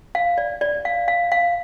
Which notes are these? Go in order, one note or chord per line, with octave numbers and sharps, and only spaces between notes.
F5
D5
D5
F5
F5
F5